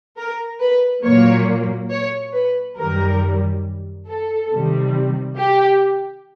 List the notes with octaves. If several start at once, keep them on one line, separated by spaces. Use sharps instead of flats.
A#4
B4
A#2 F#3 A#3 C#5
C#5
B4
F#2 D#3 G3 A#4
A4
C3 D#3 G3
G4